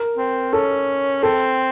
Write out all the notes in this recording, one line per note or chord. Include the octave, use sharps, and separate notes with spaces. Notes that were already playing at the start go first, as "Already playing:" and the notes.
Already playing: A#4
C4
C#4 A4
C4 A4